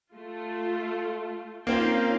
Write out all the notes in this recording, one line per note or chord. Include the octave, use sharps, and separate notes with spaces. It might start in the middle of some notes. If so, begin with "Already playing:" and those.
A3 F4
A#3 C4 C#4 D#4 F4 F5 G5